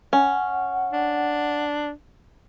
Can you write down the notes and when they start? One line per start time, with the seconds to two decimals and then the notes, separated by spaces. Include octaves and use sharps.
0.13 C#4 F#5
0.93 D4